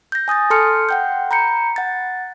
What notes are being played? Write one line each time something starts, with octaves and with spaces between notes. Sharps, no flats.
G6 A#6
G#5 D#6 G6 A6
A4 A5 C6 F6 C#7
F#5 G5 G6
A#5 B5 G6 C#7
F#5 A6